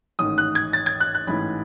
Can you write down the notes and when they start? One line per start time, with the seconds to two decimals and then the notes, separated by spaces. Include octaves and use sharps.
0.19 A1 G#2 D#3 D#6
0.38 F#6
0.55 G#6
0.73 A6
0.86 G#6
1.00 F#6
1.15 F#6
1.27 A1 G#2 E3 B5